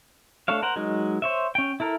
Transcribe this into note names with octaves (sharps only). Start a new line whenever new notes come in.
A3 D4 A4 C#5 F5
A#4 C5 F#5
F#3 G#3 D#4 A#4
C5 C#5 E5
C#4 G5
E4 A4 A#4